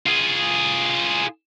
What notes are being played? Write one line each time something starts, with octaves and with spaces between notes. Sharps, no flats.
F4 G#4